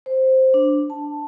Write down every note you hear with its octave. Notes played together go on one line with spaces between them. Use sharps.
C5
D4
A5